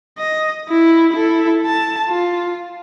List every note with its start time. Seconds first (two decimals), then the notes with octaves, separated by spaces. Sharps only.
0.18 D#5
0.69 E4
1.12 E4 A4
1.66 A5
2.08 F4